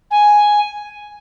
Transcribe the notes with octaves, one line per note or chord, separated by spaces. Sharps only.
G#5